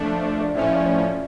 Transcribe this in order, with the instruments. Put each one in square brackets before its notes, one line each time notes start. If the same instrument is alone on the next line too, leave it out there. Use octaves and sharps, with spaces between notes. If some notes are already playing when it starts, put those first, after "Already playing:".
Already playing: [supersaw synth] F3 A3 D4 [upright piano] D5
[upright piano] D5
D5
[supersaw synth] A2 F3 C#4 [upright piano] E5
[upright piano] D5
D5